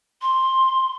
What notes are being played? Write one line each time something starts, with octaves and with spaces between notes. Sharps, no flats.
C6